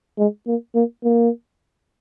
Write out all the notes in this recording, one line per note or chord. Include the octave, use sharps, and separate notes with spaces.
G#3
A#3
A#3
A#3